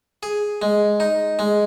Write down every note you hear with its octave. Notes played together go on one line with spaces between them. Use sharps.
G#4
G#3
D#4
G#3